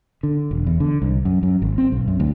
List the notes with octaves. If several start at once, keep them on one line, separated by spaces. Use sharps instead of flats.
D3
E1
E2
D3
C2
F#2
F#2
G#1
C4
B1
F#2
D2